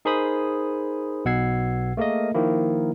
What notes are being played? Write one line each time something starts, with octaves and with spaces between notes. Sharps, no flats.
D#4 G#4 A#4 C5 B5 D#6
B1 B2 F#5 E6 G#6 C7
A3 A#3 G#4 A#4 D#5
D#3 F3 A#3 E4